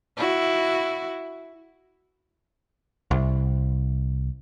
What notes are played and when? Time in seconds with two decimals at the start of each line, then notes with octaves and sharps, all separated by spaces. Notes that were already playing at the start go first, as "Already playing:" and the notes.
0.17 E4 F#4
3.11 C2